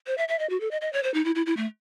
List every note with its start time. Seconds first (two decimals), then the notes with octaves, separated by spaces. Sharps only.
0.07 C5
0.18 E5
0.29 E5
0.39 D#5
0.50 F#4
0.61 A4
0.71 D#5
0.81 D#5
0.93 C#5
1.03 C5
1.14 D#4
1.25 E4
1.35 E4
1.46 E4
1.57 A3